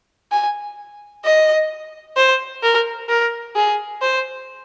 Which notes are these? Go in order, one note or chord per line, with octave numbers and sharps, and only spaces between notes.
G#5
D#5
C5
A#4
A#4
G#4
C5